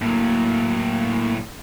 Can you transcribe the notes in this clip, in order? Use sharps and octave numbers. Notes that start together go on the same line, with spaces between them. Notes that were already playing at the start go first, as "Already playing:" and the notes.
A2 F#3 A#3